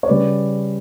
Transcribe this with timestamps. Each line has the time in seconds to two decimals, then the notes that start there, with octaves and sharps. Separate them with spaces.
0.03 C#5
0.07 C#3 G3 C#4 B4 D5